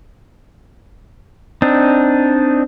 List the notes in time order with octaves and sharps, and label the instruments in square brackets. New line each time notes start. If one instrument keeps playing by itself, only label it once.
[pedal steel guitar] C4 D4 D#4